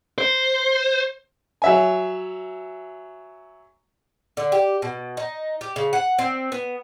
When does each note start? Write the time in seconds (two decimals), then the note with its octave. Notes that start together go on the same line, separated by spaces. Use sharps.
0.18 C5
1.62 F#3 E5 G#5
4.37 D3
4.52 G4
4.82 B2
5.17 D#4
5.61 G4
5.76 C#3
5.93 F#5
6.19 C4
6.52 B3